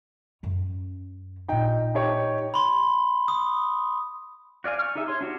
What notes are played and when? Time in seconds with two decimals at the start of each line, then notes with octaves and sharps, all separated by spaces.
0.43 F#2 C#4
1.48 A1 A#2 D#4 G5
1.94 D#4 G4 C#5
2.54 B5 C6
3.28 D#6
4.64 F#4 D5 F5 G#5
4.79 C#6 F6
4.95 D#4 G4 G#4 E5
5.08 C#5 C6
5.21 D4 F#4 G4